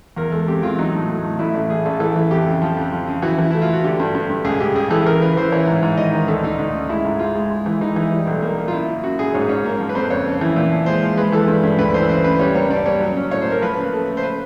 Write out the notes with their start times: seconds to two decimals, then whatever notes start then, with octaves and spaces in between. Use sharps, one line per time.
0.16 E2 A#4
0.32 G#3 A4
0.47 C4 G4
0.63 E2 F4
0.78 F#3 D#4
0.94 A2
1.09 A2
1.24 A2
1.39 A1 E4
1.54 A1
1.70 A1 G#4
1.86 A1 A4
2.00 E3 A4
2.16 E3
2.31 F2 G4
2.46 C#3
2.62 F3
2.77 F2
2.92 F3
3.07 C#3
3.22 E3 F#4
3.39 E3
3.51 A3 E4
3.62 F4
3.68 A3
3.73 F#4
3.84 D3 G4
4.00 G2
4.15 G2
4.30 G2
4.45 C#2 G#4
4.60 C#2 G4
4.75 C#2 G#4
4.90 E3 A4
5.06 E3 A#4
5.22 C#3 B4
5.37 E3 C5
5.52 E3 C#5
5.67 G#2
5.83 G#2
5.97 D#3 D#5
6.13 D#3
6.28 D2 A4
6.43 D2 D#4
6.59 D2
6.75 C#3
6.89 G#3 E4
7.05 G#2
7.19 G#3 F4
7.35 G#3
7.50 G#3
7.66 E3
7.81 E3 D#4
7.96 E3
8.12 G3
8.27 B1
8.42 A#3
8.58 A#3
8.68 F4
8.72 F#2 E4
8.89 C#3
9.03 F#2 F#4
9.19 F#2 G#4
9.34 G#2 C#5
9.49 C#4 C#5
9.64 A#3
9.80 F3
9.89 B4
9.95 F2 C5
10.10 C#3 C#5
10.25 C#3
10.41 E3
10.56 A#2
10.71 F3
10.86 G#3 C5
11.02 F3
11.17 G#3 B4
11.32 E3 A4
11.48 G2
11.63 G2
11.78 D2 B4
11.94 E3 C5
12.09 C#3 C5
12.24 C#3 B4
12.39 G3 C#5
12.54 A#3 C#5
12.70 G2 D5
12.86 G3 C#5
13.01 F#3
13.17 C#4
13.31 A2 C#5
13.42 C5
13.47 A#3 A#4
13.62 F3 B4
13.77 C#3
13.93 A3
14.08 A3
14.17 C5
14.23 B4